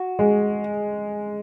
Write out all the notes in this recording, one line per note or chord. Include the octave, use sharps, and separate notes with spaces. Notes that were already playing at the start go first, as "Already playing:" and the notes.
Already playing: F#4
G#3